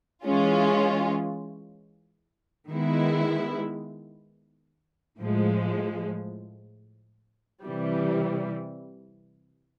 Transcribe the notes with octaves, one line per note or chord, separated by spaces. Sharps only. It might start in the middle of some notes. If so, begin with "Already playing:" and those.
E3 G#3 C#4 F4
D#3 G#3 B3 E4
A2 F3 G#3
C3 E3 G3